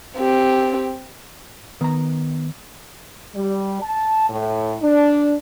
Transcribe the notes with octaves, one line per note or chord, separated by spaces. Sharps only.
C4 G4
D#3 B3 A#5
G3
A5
A2
D4